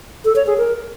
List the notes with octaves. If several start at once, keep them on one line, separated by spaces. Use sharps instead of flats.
A4
C#5
G#4
A#4